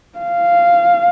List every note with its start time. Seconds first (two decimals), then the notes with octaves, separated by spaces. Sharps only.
0.19 F5